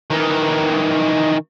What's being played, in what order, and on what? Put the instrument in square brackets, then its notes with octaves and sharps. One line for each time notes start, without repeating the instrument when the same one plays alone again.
[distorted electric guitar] D#3 E3